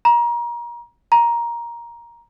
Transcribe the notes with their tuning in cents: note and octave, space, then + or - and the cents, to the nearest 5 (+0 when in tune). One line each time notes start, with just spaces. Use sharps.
A#5 +30
A#5 +10